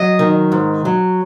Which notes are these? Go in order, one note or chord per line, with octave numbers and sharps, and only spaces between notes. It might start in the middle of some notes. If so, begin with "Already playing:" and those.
Already playing: F#3 D#5
D#3
G#2
F#3